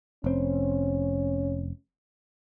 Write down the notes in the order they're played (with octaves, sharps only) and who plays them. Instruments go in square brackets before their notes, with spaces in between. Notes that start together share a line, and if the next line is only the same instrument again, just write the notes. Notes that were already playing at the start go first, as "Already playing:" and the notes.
[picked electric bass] F1 C4 [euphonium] C#4